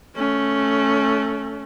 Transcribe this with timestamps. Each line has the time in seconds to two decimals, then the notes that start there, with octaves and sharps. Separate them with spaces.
0.16 A3 C#4